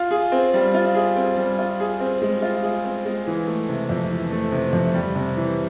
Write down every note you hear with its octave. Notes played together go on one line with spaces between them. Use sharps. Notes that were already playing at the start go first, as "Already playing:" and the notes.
Already playing: F4
G#4
C4
G3
F4
G#4
C4
G3
F4
G#4
C4
G#3
F4
G#4
C4
G#3
E3
A3
C3
F2
E3
A3
C3
F2
G3
C3
E3